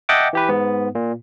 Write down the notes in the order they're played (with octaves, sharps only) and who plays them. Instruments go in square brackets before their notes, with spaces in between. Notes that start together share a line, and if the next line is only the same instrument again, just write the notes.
[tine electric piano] D#5 E5 F#5 G5 A5 D6
E3 G4 B4
G#2 B3
A#2